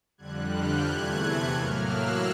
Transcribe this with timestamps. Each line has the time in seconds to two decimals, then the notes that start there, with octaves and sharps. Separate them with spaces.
0.18 F2 D3 G3 F#6 G#6
0.51 F6 G6
0.84 E2 C3 E3 A3 F#6 G#6
1.52 A2 F#3 A#3 F6 G6
1.85 E6 F#6